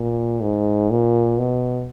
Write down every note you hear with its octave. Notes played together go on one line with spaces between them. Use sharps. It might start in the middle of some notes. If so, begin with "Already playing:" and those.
Already playing: A#2
G#2
A#2
B2